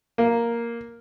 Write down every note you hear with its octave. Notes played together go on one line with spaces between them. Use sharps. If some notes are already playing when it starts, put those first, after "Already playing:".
A#3